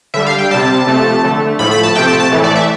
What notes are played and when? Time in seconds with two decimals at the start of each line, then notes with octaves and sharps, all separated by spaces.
0.14 D3 G3 E5
0.26 F5
0.38 G5
0.51 C3 G3 A5
0.87 C3 F3 A3
1.23 D3 A3
1.59 A2 F3 A3 B5
1.71 B5
1.83 A5
1.95 C3 F3 A3 G5
2.07 A5
2.20 A5
2.31 A2 E3 A3
2.44 D5
2.56 E5